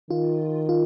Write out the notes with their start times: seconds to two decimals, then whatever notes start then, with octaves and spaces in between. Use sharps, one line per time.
0.10 D#3 F4
0.69 F4